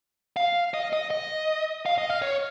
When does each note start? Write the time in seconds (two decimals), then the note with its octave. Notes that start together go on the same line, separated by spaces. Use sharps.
0.36 F5
0.74 D#5
0.93 D#5
1.10 D#5
1.86 F5
1.98 D#5
2.10 F5
2.22 C#5